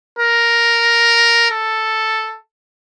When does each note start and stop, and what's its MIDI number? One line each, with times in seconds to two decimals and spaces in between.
0.19 1.47 70
1.51 2.38 69